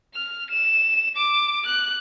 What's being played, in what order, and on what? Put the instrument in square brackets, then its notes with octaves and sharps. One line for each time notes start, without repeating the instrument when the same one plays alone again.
[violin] F6
E7
D6
F#6